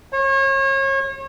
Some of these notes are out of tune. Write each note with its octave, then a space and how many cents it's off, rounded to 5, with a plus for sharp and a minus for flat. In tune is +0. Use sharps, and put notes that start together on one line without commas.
C#5 -35